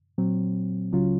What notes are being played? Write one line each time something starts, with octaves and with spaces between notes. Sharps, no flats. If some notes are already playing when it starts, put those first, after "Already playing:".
A#2 F#3 C4
C#2 C#3 F#3 C#4 F4